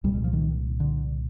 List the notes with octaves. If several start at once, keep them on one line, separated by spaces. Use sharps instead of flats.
C2 A#2 G3
G#3
F3
D#3
D3